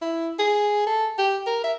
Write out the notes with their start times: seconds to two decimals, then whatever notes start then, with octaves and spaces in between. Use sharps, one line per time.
0.02 E4
0.39 G#4
0.87 A4
1.18 G4
1.46 A#4
1.64 E5